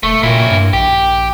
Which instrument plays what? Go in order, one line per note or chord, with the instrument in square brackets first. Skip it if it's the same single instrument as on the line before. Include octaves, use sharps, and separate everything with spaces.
[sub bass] E1 [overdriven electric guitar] A3
[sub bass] A#2 [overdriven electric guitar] A#3 E4
[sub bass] G2
[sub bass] A#1 [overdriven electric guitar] G4